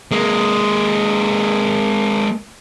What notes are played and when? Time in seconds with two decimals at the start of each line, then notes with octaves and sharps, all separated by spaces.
0.11 G#3 A#3